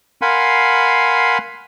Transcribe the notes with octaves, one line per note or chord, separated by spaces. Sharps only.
A#4 F5 F#5 G#5 B5 C6